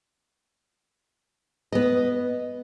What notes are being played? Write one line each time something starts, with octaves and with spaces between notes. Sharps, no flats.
B3 D#5